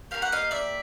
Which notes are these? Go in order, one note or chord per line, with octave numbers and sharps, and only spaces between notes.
A#3 D#4 G4 F5
F#5
D#5 F5
D5 E5